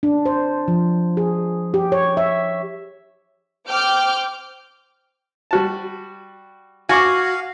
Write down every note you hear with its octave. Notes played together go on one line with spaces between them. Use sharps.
D4
C5
F3
G#4
G4
C#5
E5
C5 G5 D6 F6 G6
G3 F#4 A5
F#4 F5 G#5 C#6 D6